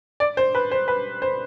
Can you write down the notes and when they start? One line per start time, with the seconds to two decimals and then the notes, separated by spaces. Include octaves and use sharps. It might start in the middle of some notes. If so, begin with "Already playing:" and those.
0.20 D5
0.37 C5
0.55 B4
0.71 C5
0.88 B4
1.22 C5